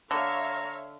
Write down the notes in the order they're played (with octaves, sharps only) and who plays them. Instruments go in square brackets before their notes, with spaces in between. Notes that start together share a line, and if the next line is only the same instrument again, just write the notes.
[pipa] D3 [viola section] C#5 E5 F5 [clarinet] A#5